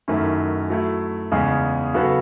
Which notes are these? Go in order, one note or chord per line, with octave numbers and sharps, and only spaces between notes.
F#2 D#3 A3 C#4 E4
F#3 A3 E4
E2 C#3 G#3 C#4 G#4
C#3 F#3 B3 F#4 A4